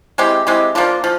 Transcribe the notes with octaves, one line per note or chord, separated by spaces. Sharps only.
G#3 C4 E4 G4
G#3 C4 E4 G4
F3 A#3 D4 F4
F3